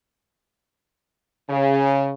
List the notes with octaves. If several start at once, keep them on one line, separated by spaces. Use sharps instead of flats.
C#3